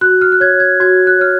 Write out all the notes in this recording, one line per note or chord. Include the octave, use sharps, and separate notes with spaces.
F#4 F#6
F6
F#6
C#5 G#6
G#6
F#4 G#6
F#6
C#5 F6